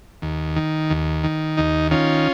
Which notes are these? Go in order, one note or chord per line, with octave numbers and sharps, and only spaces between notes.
D#2
D#3
D#2
D#3
D#2 D#4
D#3 C#4 F4